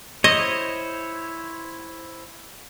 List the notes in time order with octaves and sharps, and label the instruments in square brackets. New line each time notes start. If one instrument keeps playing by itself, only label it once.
[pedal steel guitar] E4 C5 C#5 [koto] D#5